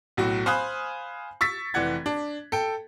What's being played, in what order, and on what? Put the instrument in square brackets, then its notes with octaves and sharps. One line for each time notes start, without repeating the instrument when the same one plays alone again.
[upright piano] B1 A2 F#3 F#4
C5 F5 G#5 B5 D#6 F#6
C#6 E6 A6 B6
F1 E3 D5 F#5 G#6
D4
A4 G5